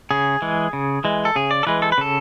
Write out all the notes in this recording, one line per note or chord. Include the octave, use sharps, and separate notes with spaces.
C#3 G#4
E3 G#3
C#3
E3 G#3
A4
C#3 G#4
D5
A4
E3 G#3 B4
A4
B4
C#3 A4